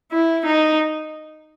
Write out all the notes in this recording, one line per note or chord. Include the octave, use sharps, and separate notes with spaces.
E4
D#4